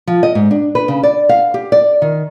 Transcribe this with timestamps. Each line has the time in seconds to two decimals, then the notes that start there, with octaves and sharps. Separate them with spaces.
0.07 F3
0.23 D#5
0.35 G#2
0.51 D4
0.75 B4
0.88 C#3
1.03 D5
1.29 F5
1.54 G4
1.72 D5
2.02 D#3